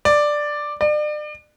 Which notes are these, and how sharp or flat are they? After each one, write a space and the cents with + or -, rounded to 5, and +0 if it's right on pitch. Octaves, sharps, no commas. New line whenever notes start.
D5 +5
D5 +35